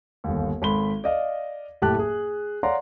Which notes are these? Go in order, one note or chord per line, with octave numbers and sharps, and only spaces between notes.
G1 D#2
G#1 A4 B5 C6 G7
D5 D#5 F5
F#1 A2 G4 A4 A5 F#6
G#4
C#5 D5 F5 F#5 A#5 C6